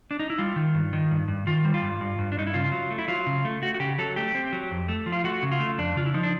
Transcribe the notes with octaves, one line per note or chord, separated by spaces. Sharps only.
D4
D#4
E4
G3 F4
D#3
G2
D#3
G2
G2
D#3 F4
G3
F4
G2
G2
G2
D4
G2 D#4
E4
C#3 F4
F#3
A3
E4
F#3 F4
C#3
A3
A3 F#4
F#4
C#3 G4
F#3 A4
A3 G4
C4
F#3
F2
A3
F3
F4
A3 F#4
C#3
F4
A3
F2 D4
C#3 F4
E4
F3 D#4
D4